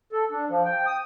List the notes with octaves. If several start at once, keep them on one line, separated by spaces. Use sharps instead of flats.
A4
D4
F3
G5
D#6